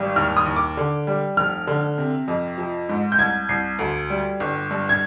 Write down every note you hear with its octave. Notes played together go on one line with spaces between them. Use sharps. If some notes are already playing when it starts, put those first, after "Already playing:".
Already playing: G#1 G3
D#2 F6
D#6
D#2
D6
D3
G3
F1 F6
D3
C3
F2
F3
G#2
G6
C2 G#6
C2 C7
D2
G3
G1
G2
G#6